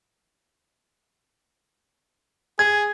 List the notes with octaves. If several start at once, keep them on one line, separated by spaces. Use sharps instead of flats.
G#4 G#6